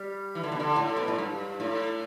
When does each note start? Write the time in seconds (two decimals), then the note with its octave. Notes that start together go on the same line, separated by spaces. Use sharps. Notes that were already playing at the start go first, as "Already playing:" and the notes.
Already playing: G3
0.35 E3
0.43 D3
0.52 B2
0.60 D3
0.76 A2
0.96 B2
1.08 A2
1.18 G2
1.60 A2